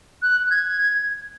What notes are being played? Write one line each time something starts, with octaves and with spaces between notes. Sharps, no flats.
F#6
G#6